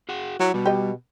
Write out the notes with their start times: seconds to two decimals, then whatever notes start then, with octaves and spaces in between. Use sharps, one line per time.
0.09 F#4 G#4 F#5
0.40 F#3 E4
0.54 B2 G3
0.66 G4 D#5